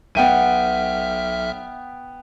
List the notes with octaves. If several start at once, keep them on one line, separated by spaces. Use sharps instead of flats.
B1 B3 E5 G5 F6 D#7